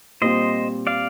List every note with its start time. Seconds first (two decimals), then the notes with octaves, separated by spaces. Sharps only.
0.21 A#2 G3 C4 F4 C5 D#5
0.87 D5 F5